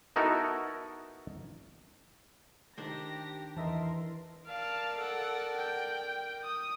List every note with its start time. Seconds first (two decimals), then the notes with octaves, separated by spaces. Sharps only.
0.16 B3 D#4 E4 F#4 A4 A#4
2.77 D#3 D4 G4 C5 A#6
3.57 E2 E3 A#4 D#5 E5 A5 C6
4.47 A#4 D5 F5 A5
4.98 A4 F#5
5.56 G5
6.43 D#6